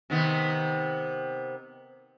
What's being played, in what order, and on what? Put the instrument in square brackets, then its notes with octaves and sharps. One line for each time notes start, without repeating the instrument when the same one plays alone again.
[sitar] C3 D#3 B3